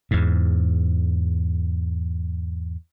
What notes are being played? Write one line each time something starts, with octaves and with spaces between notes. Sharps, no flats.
E2 G#2